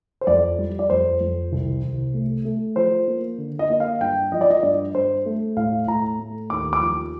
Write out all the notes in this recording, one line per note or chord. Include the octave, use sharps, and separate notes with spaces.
C5
F2 D5
G3
D5
F2 C5
F2
C2
C2
A3
A3
F3 C5
A#3
D3
D#5
A#3 D#5
F5
G2 G5
F3 D#5
D5
D#5
G2 D5
G2 C5
A3
A2 F5
A2 A#5
A3
D#2 D6
D6
F3